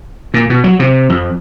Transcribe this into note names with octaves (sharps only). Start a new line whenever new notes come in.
A#2
B2
F#3
C3
F2